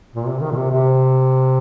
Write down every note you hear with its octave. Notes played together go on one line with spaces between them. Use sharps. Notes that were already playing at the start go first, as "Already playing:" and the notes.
A#2
C3
D#3
A#2
C3
C3